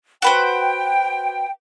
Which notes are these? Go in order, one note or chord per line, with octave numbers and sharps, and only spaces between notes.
F#4 B4 C5 G5